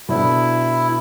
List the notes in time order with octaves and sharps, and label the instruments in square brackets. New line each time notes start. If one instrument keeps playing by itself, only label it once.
[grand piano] B2 B3 D4 A4 [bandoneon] E4